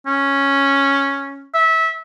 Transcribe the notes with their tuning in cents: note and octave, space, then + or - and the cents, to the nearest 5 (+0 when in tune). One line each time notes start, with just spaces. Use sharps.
C#4 -5
E5 -25